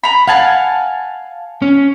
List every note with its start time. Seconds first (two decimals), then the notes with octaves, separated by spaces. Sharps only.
0.03 A#5 B5
0.27 F5 F#5 G#5 A5
1.62 C#4